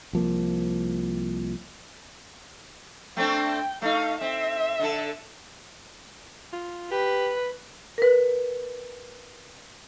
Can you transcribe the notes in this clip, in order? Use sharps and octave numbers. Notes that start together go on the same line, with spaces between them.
C2 F3 A#3
A3 C4 D4 G5
A3 D#4 F5
C4 E5
D3 A4
F4
G4 B4
A#4 B4